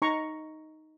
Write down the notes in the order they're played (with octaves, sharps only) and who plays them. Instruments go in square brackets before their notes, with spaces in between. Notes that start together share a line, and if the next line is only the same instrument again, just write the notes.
[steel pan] D#4 A#5 C#6